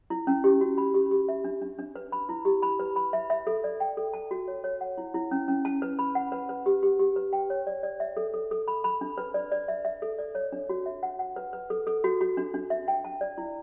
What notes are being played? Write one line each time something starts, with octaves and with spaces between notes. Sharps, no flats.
E4
C#4
G4
F#4
B5
G4
G4
E5
D4
D4
D4
B4
B5
E4
G4
B5
B4
B5
E5
E5
A4
D5
G5
A4
A5
F#4
C#5
C#5
F#5
E4
E4
C#4
C#4
A5
B4
B5
F#5
B4
B4
G4
G4
G4
B4
G5
C#5
D5
D5
E5
A4
A4
A4
B5
B5
D4
B4
D5
D5
E5
E5
A4
D5
C#5
D4
F#4
E5
F#5
F#5
B4
B4
A4
A4
F#4
F#4
D4
D4
E5
G5
A5
D5
E4